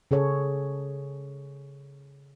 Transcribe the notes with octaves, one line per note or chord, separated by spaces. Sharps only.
C#3 G#4 A4 C#5